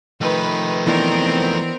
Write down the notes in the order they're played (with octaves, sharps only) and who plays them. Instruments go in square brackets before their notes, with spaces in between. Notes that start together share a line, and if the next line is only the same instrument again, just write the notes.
[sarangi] D#3 [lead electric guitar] F3 A3 [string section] B4
[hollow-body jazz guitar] E3 D4 [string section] B3 C4 A#4